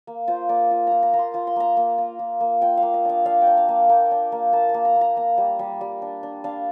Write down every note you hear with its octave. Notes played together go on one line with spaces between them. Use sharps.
A#3
F4 C5
A#3 D5
F4
F4 A#5
A#5
A#3 A#5
C6
F4 A#5
C6
A#3 A#5
A#3
F4
F4
A#3
F4 G5
F5
A#3
D#5
D4 F5
D4 F5
G5
D4
F5
A#3
A#3 G5
D4
A#3
A#3 A5
A5
A#3
A#5
A#3
A#5
A#3 A#5
G3
G3
G3
D4
D4
D4 F5